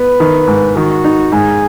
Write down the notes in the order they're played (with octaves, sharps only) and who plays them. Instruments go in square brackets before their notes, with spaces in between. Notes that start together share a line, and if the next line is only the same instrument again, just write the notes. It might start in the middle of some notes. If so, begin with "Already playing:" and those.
Already playing: [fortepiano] B3 [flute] B4
[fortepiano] D#3
G#2
[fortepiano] D#3 [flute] F#4
[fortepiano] D#4
[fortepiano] G#2 [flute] G#4